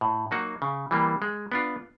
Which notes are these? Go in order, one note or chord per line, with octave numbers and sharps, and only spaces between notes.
A2
F#3 A#3 D#4 F#4
C#3
E3 G3 A#3
G#3
B3 D4 F4